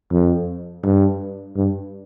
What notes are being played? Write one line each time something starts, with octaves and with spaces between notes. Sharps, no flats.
F2
G2
G2